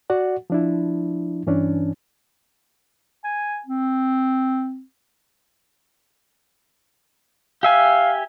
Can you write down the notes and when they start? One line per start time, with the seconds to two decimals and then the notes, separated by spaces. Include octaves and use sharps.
0.10 F#4 D5 F#5
0.50 F3 D4 E4
1.47 G2 E3 C#4 D4
3.24 G#5
3.66 C4
7.63 G4 E5 F5 G#5